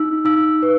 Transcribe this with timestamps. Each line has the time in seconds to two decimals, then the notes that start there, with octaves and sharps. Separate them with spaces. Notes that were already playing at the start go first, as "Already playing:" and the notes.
Already playing: D#4 E6
0.25 D#4 E6
0.62 B4